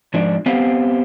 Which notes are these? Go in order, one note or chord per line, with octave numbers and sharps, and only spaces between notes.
G#2 F3 D4
B3 C4 G4 F5